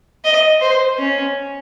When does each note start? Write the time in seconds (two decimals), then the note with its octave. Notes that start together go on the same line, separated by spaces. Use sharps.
0.25 D#5
0.61 C5
0.98 C#4